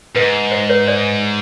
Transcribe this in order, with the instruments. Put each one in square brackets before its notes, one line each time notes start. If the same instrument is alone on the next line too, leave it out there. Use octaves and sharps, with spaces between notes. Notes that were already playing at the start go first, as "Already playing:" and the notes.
[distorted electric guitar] G#2 [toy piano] B4
[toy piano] C5
B4 C#5
C5 D5